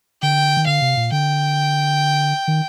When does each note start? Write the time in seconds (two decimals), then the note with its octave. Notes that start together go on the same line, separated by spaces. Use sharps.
0.22 D3 G5
0.57 D#3
0.66 D3 F5
0.81 C3
0.97 A#2
1.12 D3 G5
2.48 D#3